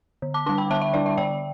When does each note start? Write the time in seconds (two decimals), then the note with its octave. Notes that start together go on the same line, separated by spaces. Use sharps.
0.22 D3
0.34 A5 D6
0.46 G3 D4 A5 D6
0.58 G5 B5
0.70 D3 E5 A5
0.81 E5
0.94 G3 D4 D5
1.06 E5
1.17 D3 D5 G5